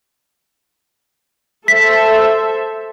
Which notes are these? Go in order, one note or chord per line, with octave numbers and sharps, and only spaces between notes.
A4 C5 E5 B6